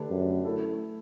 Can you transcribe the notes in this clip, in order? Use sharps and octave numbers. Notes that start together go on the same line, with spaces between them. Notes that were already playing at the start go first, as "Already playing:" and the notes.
Already playing: D3 A3 D4 G4 B4
F#2
A3 E4 A4